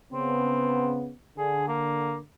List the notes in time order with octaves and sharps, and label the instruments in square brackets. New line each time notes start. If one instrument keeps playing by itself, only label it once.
[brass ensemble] C#3 B3 [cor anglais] C4
[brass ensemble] D3 [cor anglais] G#4
[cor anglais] A#3